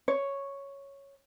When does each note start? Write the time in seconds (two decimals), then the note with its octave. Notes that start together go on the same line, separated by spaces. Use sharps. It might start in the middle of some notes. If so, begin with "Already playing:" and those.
0.08 C#5